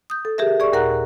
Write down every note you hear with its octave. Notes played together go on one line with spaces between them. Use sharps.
D#6 G6
A4
G4 G#4 A#4 E5
G#4 D5 C#6
D#2 A#2 A#4 F#5 A#5 F#6